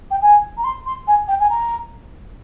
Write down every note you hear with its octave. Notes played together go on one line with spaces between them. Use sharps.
G5
G#5
A#5
C6
C6
G#5
G5
G#5
A#5